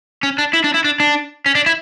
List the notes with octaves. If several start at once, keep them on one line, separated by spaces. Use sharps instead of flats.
C#4
D4
E4
D4
E4
D4
D4
C#4
D4
E4